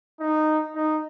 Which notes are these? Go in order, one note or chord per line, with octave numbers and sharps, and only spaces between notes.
D#4
D#4